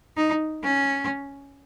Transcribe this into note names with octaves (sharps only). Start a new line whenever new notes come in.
D#4
C#4